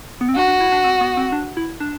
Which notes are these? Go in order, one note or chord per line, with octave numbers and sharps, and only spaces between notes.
B3
C4
D4 F#4
D4
E4
D4
C4
B3
C4
D4
E4
D4